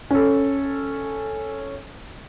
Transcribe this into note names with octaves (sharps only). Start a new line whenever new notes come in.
C#4 A4